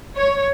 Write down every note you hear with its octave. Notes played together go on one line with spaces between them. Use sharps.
C#5